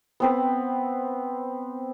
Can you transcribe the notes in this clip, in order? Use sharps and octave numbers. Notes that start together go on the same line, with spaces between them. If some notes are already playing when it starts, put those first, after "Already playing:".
B3 C4 B4